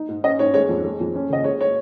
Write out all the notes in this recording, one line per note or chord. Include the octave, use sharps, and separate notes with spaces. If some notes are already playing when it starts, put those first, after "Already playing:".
Already playing: D#4
G#2
C#4 D#5
G#2 C#5
G#3 C#5
F2
G#3
F2
C#4
C#3 D#5
G#3 C#5
C#5